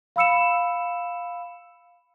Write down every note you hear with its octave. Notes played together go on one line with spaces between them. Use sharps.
F5 B5 E6 C#7 E7